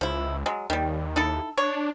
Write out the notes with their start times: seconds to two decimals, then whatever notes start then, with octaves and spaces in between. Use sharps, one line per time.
0.01 C#2 F3 E4
0.46 F#3 G#3
0.70 D#2 D#3 G3
1.16 D#4 E4 A4
1.57 D4 C#5